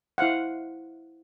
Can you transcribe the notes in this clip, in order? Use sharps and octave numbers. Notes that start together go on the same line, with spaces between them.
E4 C5 F5 F#5